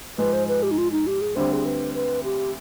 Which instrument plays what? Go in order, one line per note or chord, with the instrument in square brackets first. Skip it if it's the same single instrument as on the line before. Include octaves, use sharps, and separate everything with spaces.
[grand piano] G#2 F3 G#3 [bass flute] B4
[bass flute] C5
B4
G4
D#4
F4
D#4
G4
G#4
[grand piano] D2 D3 G3 C4 [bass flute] C5
[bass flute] G#4
B4
B4
G4